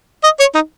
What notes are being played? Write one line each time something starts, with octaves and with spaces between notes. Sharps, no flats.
D#5
C#5
D#4